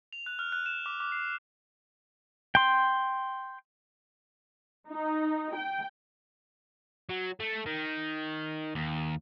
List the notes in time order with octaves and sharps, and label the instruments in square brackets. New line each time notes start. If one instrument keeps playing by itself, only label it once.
[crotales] F7
F#6
F6
F#6
E7
D6
D6
C7
[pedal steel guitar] G5 C6
[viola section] D#4
G5
[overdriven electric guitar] F#3
A3
D#3
D#2